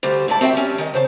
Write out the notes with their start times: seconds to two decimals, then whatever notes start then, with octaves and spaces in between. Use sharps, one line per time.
0.03 D2 G3 C5
0.28 G#2 E4 D5 A5
0.41 C4 F#4 E5 G5
0.53 G3 C#4
0.78 D#3 D#5
0.93 C#3 C5 A5